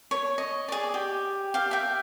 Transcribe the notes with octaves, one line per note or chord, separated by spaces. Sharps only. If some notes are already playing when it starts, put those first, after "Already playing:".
C#5
D#5
G#4 D5
G4
G4 F5
E5 G5